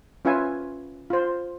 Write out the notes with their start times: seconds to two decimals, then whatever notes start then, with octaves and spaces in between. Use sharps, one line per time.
0.25 C#4 F4 B4 E5 G#5
1.10 F4 C5